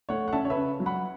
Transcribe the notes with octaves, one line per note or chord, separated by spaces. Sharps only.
A3 C#5 F#5
F#5
C#4 E5 A5
C#5
B4 E5
C#3
F#3
F#5 B5